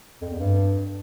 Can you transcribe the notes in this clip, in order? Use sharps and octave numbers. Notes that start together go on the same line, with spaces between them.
F2
E2
G2